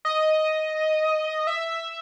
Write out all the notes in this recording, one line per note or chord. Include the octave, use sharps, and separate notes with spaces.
D#5
E5